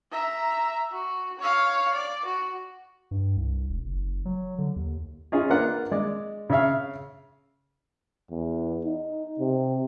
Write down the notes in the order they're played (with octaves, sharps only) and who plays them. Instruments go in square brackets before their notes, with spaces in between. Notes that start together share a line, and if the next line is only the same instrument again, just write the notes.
[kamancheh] E5 A#5
F#4
C#5 F5
D5
F#4
[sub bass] G2
C2
E1
F#1
F#3
D3
D#2
[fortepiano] C#4 D#4 F4 G#4
A#3 D4 F4 A#4 B4 F#5
G#3 D5
C#3 C#5 E5 F5
[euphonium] E2
D#4
C3